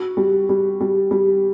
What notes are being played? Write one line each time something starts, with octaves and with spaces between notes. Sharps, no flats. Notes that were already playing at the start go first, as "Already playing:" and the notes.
Already playing: F#4
G3
G3
G3
G3